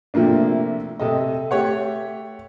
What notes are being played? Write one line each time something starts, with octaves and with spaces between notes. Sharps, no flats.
C3 F3 A3 A#3 D4
C3 A4 D#5
A3 G4 C#5 F#5